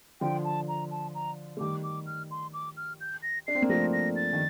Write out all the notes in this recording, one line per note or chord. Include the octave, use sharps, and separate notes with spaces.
D3 F3 G5
A5
A#5
A5
A#5
A3
D#3 G3 D6
D6
F6
C6
D6
F6
G6
A#6
D4 C7
C4
A#3
F3 A3 A#6
A#6
A6
D#3